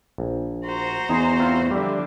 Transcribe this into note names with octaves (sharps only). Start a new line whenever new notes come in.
A#1
F#4 C5 A#5
E2 D#4 G#4
C4 F4 F#5
D3 F3 G3 E5